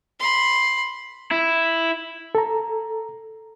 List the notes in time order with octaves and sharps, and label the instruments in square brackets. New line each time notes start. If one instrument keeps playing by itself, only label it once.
[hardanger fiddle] B5 C6
[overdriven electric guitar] E4
[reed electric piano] A4 A#5